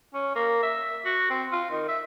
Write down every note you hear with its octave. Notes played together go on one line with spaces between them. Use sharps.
C#4
A#3
E5
F#4
C4
F4
D#3
E5